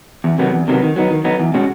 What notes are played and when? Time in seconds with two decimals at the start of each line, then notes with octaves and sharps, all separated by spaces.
0.24 E2
0.38 C3 D#3 F#3 B3
0.53 E2
0.68 C3 D#3 F#3 B3
0.82 D#3
0.96 F#3 B3 D#4
1.10 D#3
1.24 F#3 B3 D#4
1.39 E2
1.54 B2 G#3 C#4 F#4